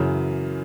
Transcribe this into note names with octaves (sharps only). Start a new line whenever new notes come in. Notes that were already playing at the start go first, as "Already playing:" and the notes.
Already playing: F#2 C#3 E3